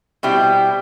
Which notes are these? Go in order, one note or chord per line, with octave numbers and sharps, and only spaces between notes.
B2 G3 C4 E4 G4